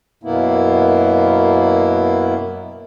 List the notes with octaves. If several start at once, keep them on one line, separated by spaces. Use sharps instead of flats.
F#2 B2 A#3 B3 E4